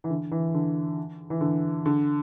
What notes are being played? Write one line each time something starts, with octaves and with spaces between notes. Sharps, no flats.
E3
D3
E3
D3
E3
D3
D3